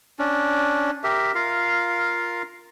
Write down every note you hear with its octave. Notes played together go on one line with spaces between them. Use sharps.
C#4 D4
G4 A#4 E5
F4 A#4 F5